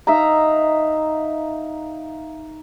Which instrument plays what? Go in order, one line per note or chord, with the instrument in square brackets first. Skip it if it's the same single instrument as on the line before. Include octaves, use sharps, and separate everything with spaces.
[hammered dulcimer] D#4 E5 F5 A#5